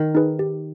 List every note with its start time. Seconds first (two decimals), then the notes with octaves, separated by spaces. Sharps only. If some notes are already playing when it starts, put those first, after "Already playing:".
Already playing: D#3
0.15 D#4 G#4 B4
0.39 G4